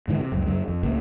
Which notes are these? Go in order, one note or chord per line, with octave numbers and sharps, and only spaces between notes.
G#2 D3 E3
C3
C#2 F#2
F#2 C#3
F2
C#2 A2 C#3 A#3